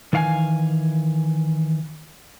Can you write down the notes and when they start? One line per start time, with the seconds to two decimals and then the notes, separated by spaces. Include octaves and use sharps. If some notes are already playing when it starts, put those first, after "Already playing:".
0.13 D#3 E3 F5 F#5 G#5